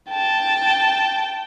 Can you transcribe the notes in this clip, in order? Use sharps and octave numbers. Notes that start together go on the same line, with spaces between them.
G5 A5